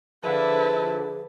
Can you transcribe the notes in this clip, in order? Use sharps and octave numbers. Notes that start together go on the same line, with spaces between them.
D3 F3 E4 G#4 B4 A5